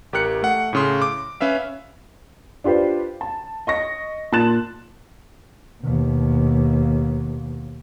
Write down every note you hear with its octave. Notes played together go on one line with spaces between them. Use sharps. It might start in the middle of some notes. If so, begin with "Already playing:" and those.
A1 G4 A#4 F#6 C#7
A3 F#5
A2 C#3 C6
D6
C#4 B4 E5 F5
D4 F4 G4 B4 C5
A5
D#5 C#6 A#6
A#2 A5 C6 F#6 A6 E7
D#2 B2